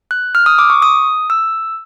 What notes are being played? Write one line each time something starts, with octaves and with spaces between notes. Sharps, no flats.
F#6
F6
D#6
D6
C#6
D#6
E6